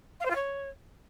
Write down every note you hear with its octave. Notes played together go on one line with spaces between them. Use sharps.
F5
C5
F4
C#5